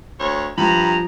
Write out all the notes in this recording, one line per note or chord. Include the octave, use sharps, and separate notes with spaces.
D2 C#5
G2 F3 A#5 B5